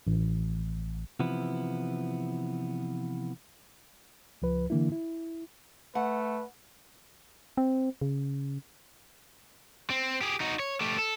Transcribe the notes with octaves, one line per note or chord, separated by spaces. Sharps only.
A1
C3 E3 F3 B3 E4
C#2 F3 B4
D3 E3 A#3 D4 E4
E4
A3 B4 F#5
C4
C#3
C4
G4 G#4
D#4 F#4
C#5
A3 G4
A4